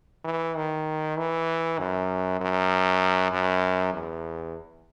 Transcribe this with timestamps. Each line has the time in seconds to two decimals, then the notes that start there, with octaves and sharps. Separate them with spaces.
0.24 E3
0.56 D#3
1.17 E3
1.79 F#2
2.40 F#2
3.32 F#2
3.93 E2